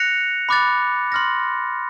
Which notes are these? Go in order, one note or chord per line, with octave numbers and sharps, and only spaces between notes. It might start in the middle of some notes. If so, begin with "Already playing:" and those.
Already playing: F#6 A#6 C#7 F7
B5 D6 F#6 A6
C6 F6 A#6